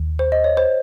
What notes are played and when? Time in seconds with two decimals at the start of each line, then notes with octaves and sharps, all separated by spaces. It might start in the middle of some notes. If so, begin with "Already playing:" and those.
Already playing: D#2
0.19 C5
0.32 D#5
0.44 C#5
0.57 C5